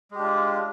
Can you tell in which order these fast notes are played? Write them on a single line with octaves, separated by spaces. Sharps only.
G#3 G4 D4 F4